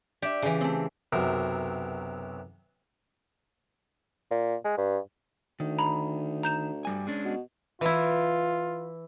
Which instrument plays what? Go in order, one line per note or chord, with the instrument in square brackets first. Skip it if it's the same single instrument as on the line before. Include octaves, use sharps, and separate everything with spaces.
[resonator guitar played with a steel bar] D4 E5 [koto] G4
[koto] C#3 E3
[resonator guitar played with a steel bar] A3 C4
[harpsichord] B1 F#2 C3 A#4
[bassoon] A#2
G#3
G2
[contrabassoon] D2 [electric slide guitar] D#3
[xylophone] A#5 B5
A#5 G6 E7
[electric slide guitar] G2 G3 G#5
G#3 C#4 D4
[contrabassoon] B2
[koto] E3 E4 [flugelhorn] F4